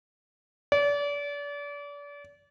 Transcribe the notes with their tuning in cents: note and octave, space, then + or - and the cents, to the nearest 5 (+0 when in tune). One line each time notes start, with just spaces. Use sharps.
D5 -35